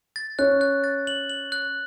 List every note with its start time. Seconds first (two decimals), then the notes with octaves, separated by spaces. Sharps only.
0.16 A6
0.39 C#4 F#6
0.61 F#6
0.84 A6
1.07 F#7
1.29 F#7
1.52 F#6